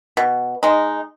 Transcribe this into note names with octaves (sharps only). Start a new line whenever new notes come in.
B2
G#3 D#4